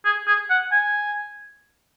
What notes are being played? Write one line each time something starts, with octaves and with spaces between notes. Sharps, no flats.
G#4
G#4
F#5
G#5